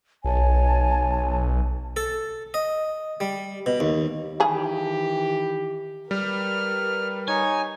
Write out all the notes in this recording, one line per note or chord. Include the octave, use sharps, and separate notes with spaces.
B1 C#5 G#5 A5
A4
D#5
G3
B2
D#2
D#3 E3 G3 G4 G#4
G3 A#4 B4 F6
D#4 C#5 G#5